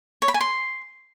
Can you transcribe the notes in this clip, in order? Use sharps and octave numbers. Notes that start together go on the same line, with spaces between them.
C#5
B5
G#5
C6